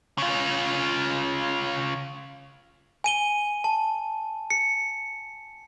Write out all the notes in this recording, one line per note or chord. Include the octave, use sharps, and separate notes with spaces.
C#3 F4
G#5 D#7 G7
A5
C#7